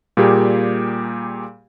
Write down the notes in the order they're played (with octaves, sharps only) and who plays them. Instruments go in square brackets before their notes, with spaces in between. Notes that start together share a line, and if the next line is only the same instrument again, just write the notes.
[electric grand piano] A#2 G3 A#3 G4 G#4